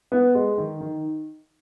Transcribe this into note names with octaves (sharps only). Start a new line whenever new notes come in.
B3
G#3
D#3
D#3